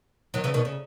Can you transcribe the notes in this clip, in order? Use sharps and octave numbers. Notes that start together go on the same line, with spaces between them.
D#3 F#3
C#3 E3
B2 D#3
C#3